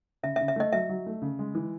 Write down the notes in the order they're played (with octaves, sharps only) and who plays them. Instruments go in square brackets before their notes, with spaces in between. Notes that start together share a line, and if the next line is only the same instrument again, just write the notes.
[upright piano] C#3 [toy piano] E5
[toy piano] E5
[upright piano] C#3
[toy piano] E5
[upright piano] A3 [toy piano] D#5
[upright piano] F#3 [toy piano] E5
[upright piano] F#3
A3
C#3
G#3
E3